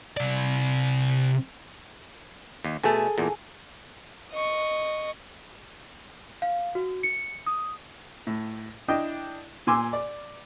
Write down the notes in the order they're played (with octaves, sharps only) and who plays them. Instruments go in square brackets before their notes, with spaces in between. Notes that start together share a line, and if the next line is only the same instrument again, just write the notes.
[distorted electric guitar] C3 D5
[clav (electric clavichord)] D#2
[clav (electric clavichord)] B2 A3 [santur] G#4 A4 G#5
[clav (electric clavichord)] E2 A#2
[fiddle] D#5 C#6
[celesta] F5
F#4
C#7
D#6
[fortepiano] A2
D4 E4 D#5 G5
A#2 G#5 C6 D6 E6
D5